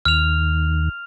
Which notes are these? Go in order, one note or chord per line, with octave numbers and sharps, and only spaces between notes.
D#2 F6 F7